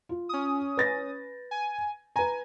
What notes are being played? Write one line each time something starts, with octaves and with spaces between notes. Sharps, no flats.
F4
C#4 D#6
B4 A6 A#6
G#5
B4 G#5 A#5